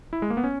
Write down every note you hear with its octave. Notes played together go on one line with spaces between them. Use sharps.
E4
G#3
A#3
B3
C#4